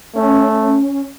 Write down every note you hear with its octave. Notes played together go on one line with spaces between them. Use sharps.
A3 C#4